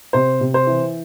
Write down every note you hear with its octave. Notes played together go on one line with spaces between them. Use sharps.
C3 C5
C3
C5
E3